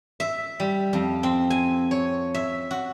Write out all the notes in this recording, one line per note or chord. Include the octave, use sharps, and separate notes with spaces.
E5
G3
F2
C4
G#5
C#5
E5
F#4